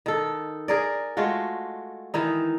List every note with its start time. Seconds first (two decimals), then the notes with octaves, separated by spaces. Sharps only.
0.06 D#3 A4
0.68 G#4 A#4 D5
1.17 G#3 A3 F4 F#4
2.14 D#3 E3 D#4